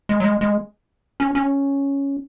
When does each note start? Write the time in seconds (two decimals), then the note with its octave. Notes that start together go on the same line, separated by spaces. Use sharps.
0.09 G#3
0.20 F#3
0.24 G#3
0.41 G#3
1.20 C#4
1.35 C#4